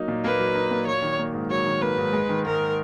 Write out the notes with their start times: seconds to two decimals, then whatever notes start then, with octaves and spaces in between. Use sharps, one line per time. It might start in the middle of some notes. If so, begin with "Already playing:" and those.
Already playing: F#3 A#3 D#4
0.08 A#2
0.24 A#3 B4
0.39 F#3
0.55 D#4
0.71 A#2
0.87 F#3 C#5
1.02 D#3
1.19 A#3
1.34 G#2
1.50 F#3 C#5
1.67 D#3
1.82 A#3 B4
1.98 G#2
2.13 G#3
2.29 D#3
2.45 G#2 A#4